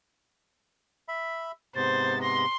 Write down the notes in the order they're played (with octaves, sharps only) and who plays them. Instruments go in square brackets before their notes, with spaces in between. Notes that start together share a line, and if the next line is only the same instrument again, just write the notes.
[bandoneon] E5 B5
[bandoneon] G#2 C3 B3 [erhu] C5 [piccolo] A6
[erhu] C6 [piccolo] A#6